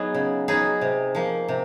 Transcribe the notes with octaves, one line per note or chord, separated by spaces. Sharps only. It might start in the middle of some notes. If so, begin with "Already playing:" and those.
Already playing: F#3 B3 D#4 G#4
C#3
F#3 B3 D#4 G#4
C3
F3 A#3
C3